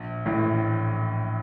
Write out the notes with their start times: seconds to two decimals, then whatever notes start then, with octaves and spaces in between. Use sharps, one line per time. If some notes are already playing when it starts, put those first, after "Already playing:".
Already playing: A#1
0.26 A1 A2